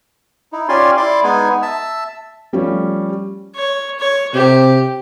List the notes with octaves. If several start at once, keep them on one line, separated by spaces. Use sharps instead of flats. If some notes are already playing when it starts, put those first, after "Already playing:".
D#4 E4
C#4 F4 G4 D5 G#5 C6
E4 D5 C6 D6
G#3 B3 D#4 G#5
E5 A5 E6
F3 G3 A3 C#4
C#5
C#5
C3 G4